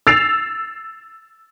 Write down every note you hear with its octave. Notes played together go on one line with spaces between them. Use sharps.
E6 A6 C7 F7